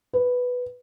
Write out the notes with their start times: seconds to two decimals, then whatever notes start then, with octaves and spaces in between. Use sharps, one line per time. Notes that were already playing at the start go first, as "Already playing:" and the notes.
0.13 B4